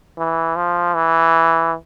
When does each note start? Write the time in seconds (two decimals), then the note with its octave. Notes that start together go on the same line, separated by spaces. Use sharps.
0.18 E3
0.56 F3
0.94 E3